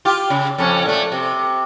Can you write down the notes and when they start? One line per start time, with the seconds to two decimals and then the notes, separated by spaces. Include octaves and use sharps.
0.05 F4 G4
0.30 C#3
0.58 F2 C#4
0.86 A#2 A3
1.12 C3